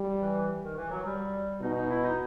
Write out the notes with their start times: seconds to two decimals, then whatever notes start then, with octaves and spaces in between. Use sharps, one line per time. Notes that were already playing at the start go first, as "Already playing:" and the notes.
Already playing: G3
0.22 E3
0.63 D#3
0.77 E3
0.90 F#3
1.05 G3
1.61 B2 D#4
1.74 D#4
1.89 E4
2.03 D#4